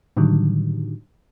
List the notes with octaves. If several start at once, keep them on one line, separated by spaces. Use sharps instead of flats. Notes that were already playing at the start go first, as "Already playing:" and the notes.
A2 D3 D#3 F#3 G3